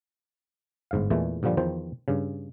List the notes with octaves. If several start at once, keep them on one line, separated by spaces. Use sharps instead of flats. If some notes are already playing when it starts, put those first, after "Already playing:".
G1 G#2 F5
E2 A#2 E3 G#3 A3
G2 A#2 D3 F3 G3
E2 D#3 F3 C5 G5
G2 C#3